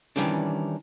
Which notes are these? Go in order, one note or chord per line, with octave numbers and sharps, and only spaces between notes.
D#3 E3 G3 C#4 D4